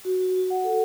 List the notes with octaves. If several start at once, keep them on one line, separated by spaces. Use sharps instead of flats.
F#4
F#4
F#4
F#5
A4